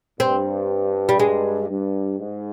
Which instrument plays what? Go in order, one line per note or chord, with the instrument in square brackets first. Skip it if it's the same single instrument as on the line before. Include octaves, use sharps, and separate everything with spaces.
[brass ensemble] G2 [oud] C4
[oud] G3
G#3
[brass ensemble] G2
G#2